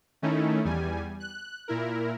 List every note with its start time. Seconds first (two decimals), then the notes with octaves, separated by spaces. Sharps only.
0.22 D#3 A3 C#4 D#4 E4
0.65 E2 G3 G#5
1.20 F#6
1.68 A#2 E4 A#4